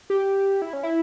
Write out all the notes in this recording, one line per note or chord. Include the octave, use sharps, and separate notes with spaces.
G4
E4
C#4
E4